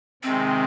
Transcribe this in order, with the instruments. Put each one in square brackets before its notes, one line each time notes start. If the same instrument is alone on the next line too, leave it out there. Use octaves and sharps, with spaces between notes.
[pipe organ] C3 D#3 G#3 [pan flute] C4